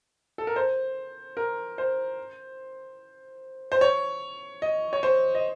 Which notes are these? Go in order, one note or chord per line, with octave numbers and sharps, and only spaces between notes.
A4
A#4
C5
A#4
C5
C5
C#5
D#5
C#5
C5
D#5